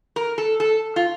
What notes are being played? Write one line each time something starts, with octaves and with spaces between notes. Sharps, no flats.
A#4
A4
A4
F4